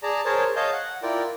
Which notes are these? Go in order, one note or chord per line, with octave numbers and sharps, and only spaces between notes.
G#4 D5 A5 A#5
G#4 A#4 C5 C#5 A5
C#5 D#5 F5 A5 G6
F#5
E4 F4 A#4 D5 G5